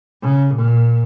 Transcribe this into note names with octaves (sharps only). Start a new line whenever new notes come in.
C#3
A#2